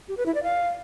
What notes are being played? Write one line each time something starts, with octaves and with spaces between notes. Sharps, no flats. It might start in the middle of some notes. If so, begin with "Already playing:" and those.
G4
B4
E4
D5
F5